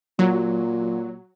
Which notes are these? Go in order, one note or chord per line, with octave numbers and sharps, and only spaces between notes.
A#2 F#3